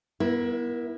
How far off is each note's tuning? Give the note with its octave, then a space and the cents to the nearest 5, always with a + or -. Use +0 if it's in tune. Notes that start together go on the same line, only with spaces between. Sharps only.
B3 -25 E4 +0 A#4 +25